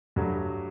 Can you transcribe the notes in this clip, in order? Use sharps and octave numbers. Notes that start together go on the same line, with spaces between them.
G2 F#3 A3